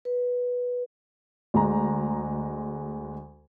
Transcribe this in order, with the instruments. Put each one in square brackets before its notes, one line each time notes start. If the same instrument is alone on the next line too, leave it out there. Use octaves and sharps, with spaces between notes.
[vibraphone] B4
[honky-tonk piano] D2 G#3 A#5